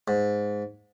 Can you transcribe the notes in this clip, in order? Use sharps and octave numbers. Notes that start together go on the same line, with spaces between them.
G#2